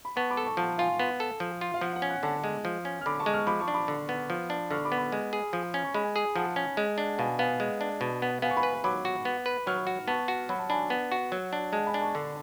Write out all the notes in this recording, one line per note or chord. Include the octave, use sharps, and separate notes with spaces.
B5
B3 A5 C#6
B5 D6
A4
A5 C#6
F3 F#5 A5
F4 F5 G#5
B3
A4
F3
F4
F5
F3 F#5
F#5
C#4
F#5
D3 F#5 A5
G#3
F3
C#4
F6
D3 B5 D6
A5 C#6
G#3
C#6 F6
F3 B5 D6
A5 C#6
D4
B5 D6
D3
B3
F3
D4
D3 C#6 F6
B5 D6
B3
B5 D6
G#3
G#4
F3
C#4
C#6
G#3 G#5 B5
G#4
F3 F#5 A5
C#4
G#3
D4
B2 F5 G#5
B3 F5 G#5
G#3
D4
B2
B3
B3 F5 G#5
C#6
G#5 B5
B4
F#3 B5 D6
F#4
B3
B4
F#3 C#6 F6
F#4
B3 A5 C#6
F#4
F#3 B5
A5
D4 G#5 B5
B3
F#4
F#3
D4
G#3 F#5 A5
G#5 B5
D4
A5 C#6
D3